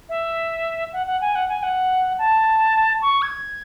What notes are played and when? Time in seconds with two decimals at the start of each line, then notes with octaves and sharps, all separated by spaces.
0.09 E5
0.93 F#5
1.07 F#5
1.21 G#5
1.35 F#5
1.49 G#5
1.63 F#5
2.18 A5
3.02 C#6
3.22 G#6